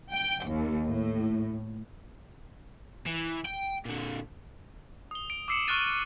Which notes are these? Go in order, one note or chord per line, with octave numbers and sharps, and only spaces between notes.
G5
D#2
A2
E3
G5
A#2 D3
D#6 G7
D7
D6 E6 C7 C#7 E7
C#6 F6 F#6 A6 D#7